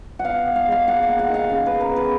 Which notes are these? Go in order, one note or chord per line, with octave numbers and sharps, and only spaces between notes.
F#5
B3 F5
B3
F5
G#3 F5
A#3 F#5
F5
A#3
F#5
D#3 F5
C#3 F5
B3 B4
A#4
B3
B4